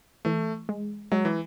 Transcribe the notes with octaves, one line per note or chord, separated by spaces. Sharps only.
E3 A3
G#3
F#3 G#3
E3